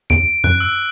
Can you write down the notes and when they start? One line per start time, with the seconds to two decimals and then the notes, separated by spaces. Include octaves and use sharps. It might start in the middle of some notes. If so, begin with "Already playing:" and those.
0.10 E2 D7
0.44 F#2 F#6
0.60 E6